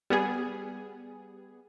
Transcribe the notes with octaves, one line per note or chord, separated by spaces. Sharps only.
G3 B3 G#4